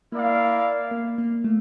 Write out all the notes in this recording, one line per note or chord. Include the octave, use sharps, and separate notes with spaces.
A#3 E4 A#4 D5 F5
A#3
A#3
A3